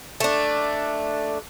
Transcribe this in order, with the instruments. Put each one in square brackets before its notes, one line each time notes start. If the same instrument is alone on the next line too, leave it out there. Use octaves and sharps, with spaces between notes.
[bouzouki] A3 D4